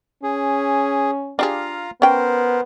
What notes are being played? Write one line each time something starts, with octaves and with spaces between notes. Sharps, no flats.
C#4 G#4
D4 F4 G4 G#4 F5 A#5
B3 C#4 A#4 C5 G5